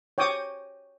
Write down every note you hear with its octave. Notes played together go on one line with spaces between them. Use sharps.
C#5 G5 D6 D#6